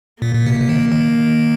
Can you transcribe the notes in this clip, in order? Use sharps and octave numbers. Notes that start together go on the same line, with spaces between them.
A#2 A#3
A#2
C3
C3
D#3
D#3